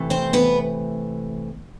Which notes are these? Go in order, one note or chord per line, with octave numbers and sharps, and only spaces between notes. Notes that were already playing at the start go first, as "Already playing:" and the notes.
Already playing: C3 E3 A3
C4 C5
B3 B4